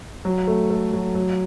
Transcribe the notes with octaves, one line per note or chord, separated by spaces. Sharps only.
F#3
A3
A3
F#3
F#3